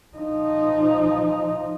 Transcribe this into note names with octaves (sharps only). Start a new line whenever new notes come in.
F3 D#4